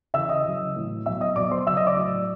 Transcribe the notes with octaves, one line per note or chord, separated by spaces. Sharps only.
C#3 E3 E5 E6
D#5 D#6
C#3 F#3
A2 E3
B2 F#3 E5 E6
D#5 D#6
B2 F#3 D5 D6
C5 C6
C#3 F#3 E5 E6
D#5 D#6
D5 D6
A2 F#3